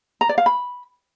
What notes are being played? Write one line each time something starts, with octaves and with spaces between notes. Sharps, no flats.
A#5
D5
F5
B5